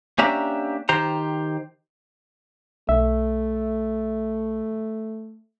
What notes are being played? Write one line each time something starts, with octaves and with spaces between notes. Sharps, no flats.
A#3 C#4 D4 G4 E5 A#5
D#3 G4 C5 A#5
B1 A3 E5